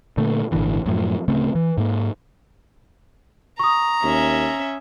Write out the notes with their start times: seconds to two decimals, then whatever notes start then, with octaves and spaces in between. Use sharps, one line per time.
0.17 A#2 D3 A3
0.52 G#1 A#2 D3 E3
0.86 F#2 A2 F3
1.28 D1 C#3 A3 C4
1.55 E3
1.78 G#2 A#3
3.59 A#5 C#6 D#6
4.03 D#2 C#4 E5